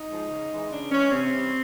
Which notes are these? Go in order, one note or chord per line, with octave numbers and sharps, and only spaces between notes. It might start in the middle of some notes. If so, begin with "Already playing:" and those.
Already playing: D#4
F3 G#3
C#3
E3 G#3
C#3 D4
E3 G#3 C#4
C3 C4
E3 G3